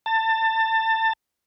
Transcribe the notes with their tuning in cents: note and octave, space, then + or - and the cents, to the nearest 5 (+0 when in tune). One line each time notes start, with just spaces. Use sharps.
A5 +25